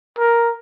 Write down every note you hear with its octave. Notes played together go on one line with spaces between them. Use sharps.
A#4